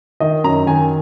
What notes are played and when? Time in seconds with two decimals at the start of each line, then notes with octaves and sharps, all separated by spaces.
0.20 D#3 D#5
0.44 F#2 A#5
0.67 D#3 G#5